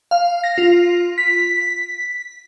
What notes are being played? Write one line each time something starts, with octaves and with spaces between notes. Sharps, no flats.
F5
A#6
F4
B6